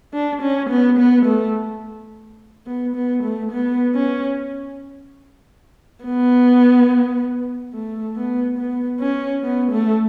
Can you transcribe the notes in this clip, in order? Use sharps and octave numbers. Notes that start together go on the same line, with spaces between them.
D4
C#4
B3
B3
A3
B3
B3
A3
B3
C#4
B3
A3
B3
B3
C#4
B3
A3